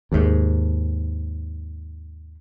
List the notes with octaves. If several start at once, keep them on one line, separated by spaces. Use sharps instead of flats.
D#2 G#2